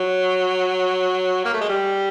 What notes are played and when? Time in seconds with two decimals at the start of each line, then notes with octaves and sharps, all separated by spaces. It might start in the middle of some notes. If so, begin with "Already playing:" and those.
Already playing: F#3
1.45 A#3
1.54 A3
1.61 G#3
1.69 G3